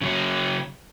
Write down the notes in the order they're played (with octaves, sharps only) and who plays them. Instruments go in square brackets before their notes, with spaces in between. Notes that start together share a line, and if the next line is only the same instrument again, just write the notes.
[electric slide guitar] C#3 F#3 C#4